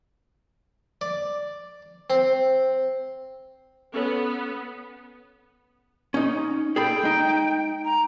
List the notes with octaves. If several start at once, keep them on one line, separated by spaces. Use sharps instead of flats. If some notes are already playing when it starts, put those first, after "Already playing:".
D5
C4
B3 C#4 A4 C#5
C#4 D#4
G#4 A4 G5 B5
G#3 D#4
A#5